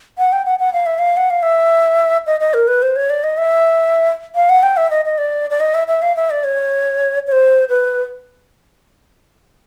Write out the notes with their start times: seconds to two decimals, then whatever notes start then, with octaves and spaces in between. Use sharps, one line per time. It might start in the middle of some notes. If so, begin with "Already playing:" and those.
0.18 F#5
0.32 G5
0.46 F#5
0.59 F#5
0.73 F5
0.86 E5
0.99 F5
1.17 F#5
1.30 F5
1.43 E5
2.27 D#5
2.40 D#5
2.54 A#4
2.68 B4
2.82 C5
2.96 C#5
3.10 D5
3.24 D#5
3.38 E5
4.35 F5
4.49 F#5
4.63 G5
4.77 E5
4.91 D#5
5.05 D#5
5.18 D5
5.50 D5
5.60 D#5
5.74 E5
5.88 E5
6.02 F5
6.16 E5
6.30 D5
6.44 C#5
7.27 C#5
7.32 C5
7.69 B4